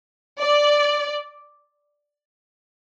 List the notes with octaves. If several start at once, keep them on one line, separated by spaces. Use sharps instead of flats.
D5